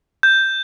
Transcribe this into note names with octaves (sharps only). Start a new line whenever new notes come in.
G6